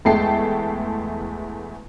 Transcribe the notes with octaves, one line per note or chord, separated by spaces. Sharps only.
E2 G#3 A3 G5 A5 C7